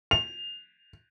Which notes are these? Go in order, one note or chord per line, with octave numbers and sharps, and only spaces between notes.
F7